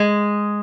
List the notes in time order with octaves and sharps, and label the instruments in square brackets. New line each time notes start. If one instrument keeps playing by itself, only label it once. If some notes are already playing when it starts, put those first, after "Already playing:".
Already playing: [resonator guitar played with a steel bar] G#3